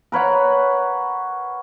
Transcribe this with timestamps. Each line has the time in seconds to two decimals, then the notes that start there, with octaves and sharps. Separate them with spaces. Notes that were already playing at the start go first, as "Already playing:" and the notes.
0.12 A#4 B4 C#5 F#5